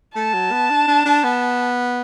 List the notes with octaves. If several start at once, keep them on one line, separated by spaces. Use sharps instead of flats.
A3 A5
F#3
B3
D4
D4
D4
B3